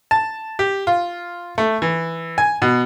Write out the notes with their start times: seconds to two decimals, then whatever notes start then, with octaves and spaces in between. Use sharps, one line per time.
0.11 A5
0.59 G4
0.87 F4
1.58 A3
1.82 E3
2.38 G#5
2.62 B2